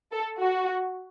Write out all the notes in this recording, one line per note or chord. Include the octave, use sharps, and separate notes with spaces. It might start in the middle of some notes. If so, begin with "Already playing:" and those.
A4
F#4